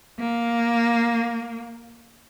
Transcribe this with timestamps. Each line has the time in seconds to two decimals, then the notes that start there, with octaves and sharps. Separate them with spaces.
0.19 A#3